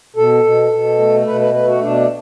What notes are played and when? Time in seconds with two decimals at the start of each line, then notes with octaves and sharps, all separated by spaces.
0.16 B2 A4
0.44 B2
0.72 B2
0.99 A3
1.27 B2 B4
1.41 B4
1.54 A3 B4
1.68 F#4
1.82 B2 D4